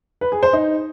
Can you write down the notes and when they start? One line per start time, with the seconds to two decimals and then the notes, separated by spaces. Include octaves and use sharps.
0.21 B4
0.32 G#4
0.43 C5
0.53 D#4